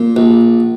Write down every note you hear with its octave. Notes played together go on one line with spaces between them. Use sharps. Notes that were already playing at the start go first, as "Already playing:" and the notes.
Already playing: A#2
A#1